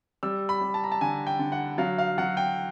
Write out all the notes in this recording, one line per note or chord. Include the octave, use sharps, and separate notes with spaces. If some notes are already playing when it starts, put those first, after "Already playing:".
G3 E6
B5
G3
A5
A#5
A5
D3 G#5
G5
D3
F#5
F#3 F5
F5
F#3 F#5
G5